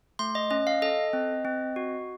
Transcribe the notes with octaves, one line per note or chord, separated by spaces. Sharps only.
A3 C6
D#5
C#4 D#5
F5
A4 D#5
C4
C4
F#4